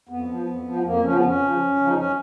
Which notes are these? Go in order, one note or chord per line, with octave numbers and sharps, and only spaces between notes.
F2 B3
F3
F2
F3
F2 A#3
C#3 F3 C#4
B3
F2 C#4
C#3 F3
F#2
C#3 F3
D#4
F#2 C#4